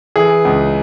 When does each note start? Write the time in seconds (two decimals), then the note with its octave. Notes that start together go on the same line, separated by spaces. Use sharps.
0.16 E3 G#4
0.45 C#2